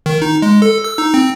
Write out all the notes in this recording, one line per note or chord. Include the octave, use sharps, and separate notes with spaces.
D#3
D#4
G#3
A4
E6
D#4
C4